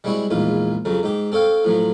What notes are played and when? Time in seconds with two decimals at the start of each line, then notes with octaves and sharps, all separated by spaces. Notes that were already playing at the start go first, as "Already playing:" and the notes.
0.04 G3 G#3 C4 E4 F#4
0.30 A#1 E2 G#2 F4
0.85 F2 C#3 F#3
1.03 G#2 G4
1.32 C4 A4 C#5 F5 G5
1.65 A2 F3 F#3